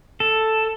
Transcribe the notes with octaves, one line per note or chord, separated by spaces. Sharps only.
A4